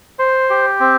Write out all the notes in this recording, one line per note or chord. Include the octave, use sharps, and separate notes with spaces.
C5
G4
C4